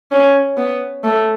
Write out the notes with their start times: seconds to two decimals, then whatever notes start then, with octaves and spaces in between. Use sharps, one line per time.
0.11 C#4
0.57 B3
1.04 A3